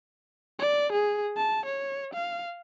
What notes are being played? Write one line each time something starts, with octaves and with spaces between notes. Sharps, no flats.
D5
G#4
A5
C#5
F5